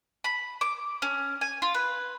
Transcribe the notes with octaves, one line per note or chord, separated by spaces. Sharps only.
B5
D6
C#4
G#5
F4
B4